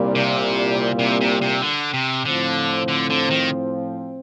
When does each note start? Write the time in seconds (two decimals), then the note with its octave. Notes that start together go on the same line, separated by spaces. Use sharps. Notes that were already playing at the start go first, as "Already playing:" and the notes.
Already playing: C2 A#2 G3 A#3
0.15 C3
0.99 C3
1.21 C3
1.41 C3
1.62 D3
1.94 C3
2.25 A2 D3 F3 C4
2.88 D3
3.10 D3
3.30 D#3